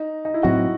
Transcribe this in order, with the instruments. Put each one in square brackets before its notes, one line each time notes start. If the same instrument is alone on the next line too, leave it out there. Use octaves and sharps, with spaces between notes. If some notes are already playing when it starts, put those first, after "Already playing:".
Already playing: [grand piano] D#4
D#4
E4
[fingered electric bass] A2 F#3 C4 [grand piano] F#4